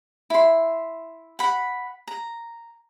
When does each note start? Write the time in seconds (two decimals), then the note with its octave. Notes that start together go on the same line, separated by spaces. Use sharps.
0.30 E4 C6
1.39 F#5 B5
2.07 A#5